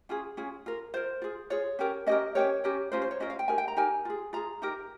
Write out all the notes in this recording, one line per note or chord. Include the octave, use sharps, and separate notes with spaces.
C#4 F4 G#4
C#4 F4 G#4
F4 A#4
F4 A#4 C5
F4 G#4
F4 G#4 C#5
C#4 G4 A#4
C#4 G4 A#4 D#5
C#4 G4 A#4 C#5
C#4 G4 A#4
C#4 F4 A#4 C5
C5
C#5
C#4 F4 A#4 D#5
F5
G5
D#4 G4 A#4 G#5
G5
A#5
D#4 G4 A#4 G#5
F4 G#4
F4 G#4 A#5
D#4 G4 A#4